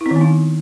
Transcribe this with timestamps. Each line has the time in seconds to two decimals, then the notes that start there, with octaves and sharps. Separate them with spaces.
0.01 E4
0.06 C4
0.11 D#3
0.16 B3
0.21 D#4